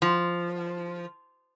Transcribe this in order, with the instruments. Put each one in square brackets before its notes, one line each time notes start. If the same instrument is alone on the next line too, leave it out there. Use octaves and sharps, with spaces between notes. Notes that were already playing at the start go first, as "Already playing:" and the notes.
[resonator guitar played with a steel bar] F3